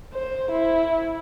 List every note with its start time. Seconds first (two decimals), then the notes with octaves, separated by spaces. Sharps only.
0.13 C5
0.51 E4